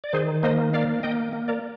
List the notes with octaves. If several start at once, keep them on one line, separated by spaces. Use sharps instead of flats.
D5
D#3 G#4 C5
A#3 C5 D#5
A#3 D5 F5
A#3 D#5 G5
A#3
A#4 D5